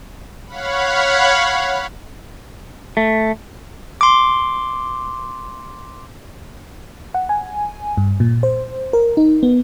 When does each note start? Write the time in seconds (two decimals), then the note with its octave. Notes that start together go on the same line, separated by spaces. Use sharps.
0.46 C#5 F5 F#5 B5
2.97 A3
4.01 C6 D6
7.14 F#5
7.29 G#5
7.97 G2
8.20 A#2
8.43 C5
8.93 A#4
9.17 D#4
9.43 B3